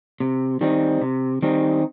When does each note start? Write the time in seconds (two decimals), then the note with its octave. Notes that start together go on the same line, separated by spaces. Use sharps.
0.20 C3
0.61 D#3 G3 C4 D#4
1.01 C3
1.42 D#3 G3 C4 D#4